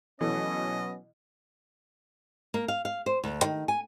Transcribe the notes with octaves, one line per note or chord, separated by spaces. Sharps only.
B2 E3 F#3 A3 B3 C#4 D#5
A#3
F5
F5
C5
D2
D#3
G#5